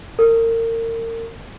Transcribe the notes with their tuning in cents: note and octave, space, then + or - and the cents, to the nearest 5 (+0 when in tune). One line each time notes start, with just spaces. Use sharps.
A#4 -35